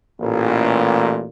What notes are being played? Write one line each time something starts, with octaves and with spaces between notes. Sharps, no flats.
A1 A#2